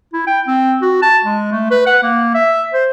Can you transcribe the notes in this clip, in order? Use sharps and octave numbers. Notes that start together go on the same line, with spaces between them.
E4
G5
C4
F#4
A5
G#3
A3
B4
F#5
A#3
E5
C5